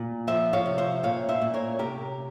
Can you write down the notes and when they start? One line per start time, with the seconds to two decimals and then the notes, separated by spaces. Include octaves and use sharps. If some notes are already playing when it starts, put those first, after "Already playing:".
Already playing: A#2
0.27 F3 C5 E5
0.53 C#5 F5
0.66 C3
0.78 C5 E5
1.03 A#2 C#5 F5
1.29 C5 E5
1.41 A#2
1.54 A#4 C#5
1.79 C3 G4 A#4